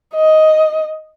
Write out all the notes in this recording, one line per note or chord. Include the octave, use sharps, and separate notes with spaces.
D#5